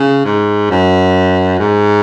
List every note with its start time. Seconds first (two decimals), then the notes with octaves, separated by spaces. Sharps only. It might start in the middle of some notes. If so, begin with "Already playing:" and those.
Already playing: C#3
0.25 G#2
0.71 F#2
1.59 G#2